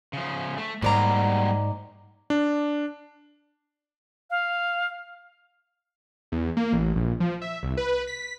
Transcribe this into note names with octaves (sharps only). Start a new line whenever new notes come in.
C#3 F3
A3
G#2 F#3 G3 A#3 D5 A#5
D4
F5
E2
A#3
A1
A#1
F3
E5
C2
B4
B6